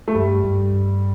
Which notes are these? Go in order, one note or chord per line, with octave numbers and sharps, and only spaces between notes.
A3
G2 G3
G2
G2